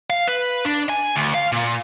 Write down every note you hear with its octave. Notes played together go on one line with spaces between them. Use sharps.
F5
B4
D4
G#5
D2
F5
A#2